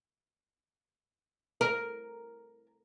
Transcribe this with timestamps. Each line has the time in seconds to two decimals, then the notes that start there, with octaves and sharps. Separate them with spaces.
1.61 A#4